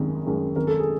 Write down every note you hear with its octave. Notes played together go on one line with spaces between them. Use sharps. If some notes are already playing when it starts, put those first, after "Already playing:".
Already playing: G#1 F#2 D#3 G#4
F#2 D#3 G#3
G#1 A#4
A4
G#4